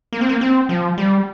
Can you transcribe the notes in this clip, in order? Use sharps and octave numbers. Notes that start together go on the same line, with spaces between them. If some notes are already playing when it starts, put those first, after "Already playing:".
A#3
C4
A#3
C4
F3
G3